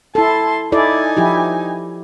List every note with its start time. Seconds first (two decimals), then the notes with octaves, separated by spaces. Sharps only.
0.15 E4 A4 A5 C6
0.72 D#4 E4 A4 D5 G#5
1.17 F3 E4 G4